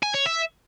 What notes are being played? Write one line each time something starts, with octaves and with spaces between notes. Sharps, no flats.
G#5
C#5
E5